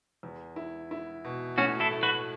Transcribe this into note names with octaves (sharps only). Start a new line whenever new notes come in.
E2
E4
E4
B2
A2 C#4 F#4
E4 A4
A3
F#4 B4